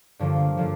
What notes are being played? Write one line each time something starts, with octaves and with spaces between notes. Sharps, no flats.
G2 D3 F3 A#3 F4
D3 F3 A#3 F4